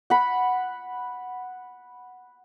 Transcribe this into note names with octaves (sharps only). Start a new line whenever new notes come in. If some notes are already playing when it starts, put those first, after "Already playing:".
F#5 B5